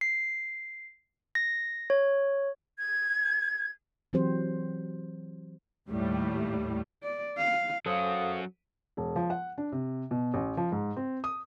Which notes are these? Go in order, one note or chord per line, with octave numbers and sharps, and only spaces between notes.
C7
A#6
C#5
G#6
E3 F#3 C4 F#4 G4 C5
D#2 A2 G3
D5
F5
F#3 C#4 F#4 A4 C5 F5 F#5 D#6
E1
F3
F#5
D4
C3
B2
A1
F3
G#2
C4
D#6